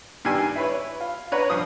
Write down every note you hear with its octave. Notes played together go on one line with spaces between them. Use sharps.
G2 D#3 G3 G5 G#5 E6
E4 B4 C#5
F4
D4 B4 C#5 F#5 A#5
G2 F3 D#6